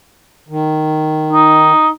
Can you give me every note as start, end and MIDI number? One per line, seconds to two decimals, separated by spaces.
0.48 1.72 51
1.33 1.89 63